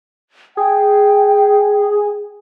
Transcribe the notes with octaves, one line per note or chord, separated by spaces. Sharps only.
G#4 G5